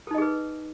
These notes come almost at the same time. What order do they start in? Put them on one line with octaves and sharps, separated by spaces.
A4 D#4 D#5 G#4 B4